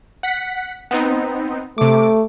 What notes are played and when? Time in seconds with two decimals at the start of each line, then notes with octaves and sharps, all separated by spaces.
0.23 F#5 B6
0.91 B3 C4 D#4
1.78 C3 A3 D6